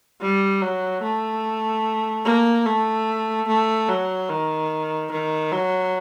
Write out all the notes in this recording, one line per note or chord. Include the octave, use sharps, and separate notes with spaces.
G3
F#3
A3
A#3
A3
A3
F#3
D#3
D#3
F#3